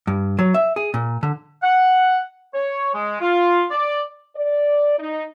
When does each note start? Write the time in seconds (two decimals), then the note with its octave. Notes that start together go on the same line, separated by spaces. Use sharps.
0.07 G2
0.39 F#3
0.54 E5
0.76 G#4
0.94 A#2
1.23 D3
1.63 F#5
2.55 C#5
2.94 G#3
3.21 F4
3.71 D5
4.36 D5
4.98 D#4